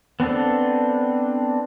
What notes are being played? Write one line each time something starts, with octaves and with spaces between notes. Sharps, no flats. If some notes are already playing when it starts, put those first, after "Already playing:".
B3 C4 D4 A4